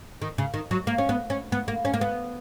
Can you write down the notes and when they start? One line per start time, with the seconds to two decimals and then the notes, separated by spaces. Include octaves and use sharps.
0.22 D#3
0.38 C#3
0.54 D#3
0.71 F#3
0.87 A#3
0.98 C#4
1.09 B3
1.30 C#4
1.52 B3
1.68 A#3
1.85 C#4
1.94 A#3
2.01 B3